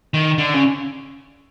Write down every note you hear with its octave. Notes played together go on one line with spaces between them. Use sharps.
D#3
D3
C#3